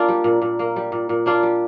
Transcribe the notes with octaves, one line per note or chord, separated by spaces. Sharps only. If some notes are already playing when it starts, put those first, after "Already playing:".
Already playing: A#3 D4 F4
G3
A#2
A#2
A#3
G3
A#2
A#2
A#3 D4 F4
G3